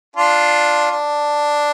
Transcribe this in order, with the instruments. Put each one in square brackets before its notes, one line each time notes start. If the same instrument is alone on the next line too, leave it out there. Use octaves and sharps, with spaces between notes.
[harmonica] D4 F4
D4